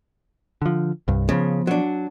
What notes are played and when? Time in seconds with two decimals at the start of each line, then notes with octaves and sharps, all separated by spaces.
0.62 D3 F3
1.08 C2 G2
1.29 C#3 F3 B3
1.67 F#3 D4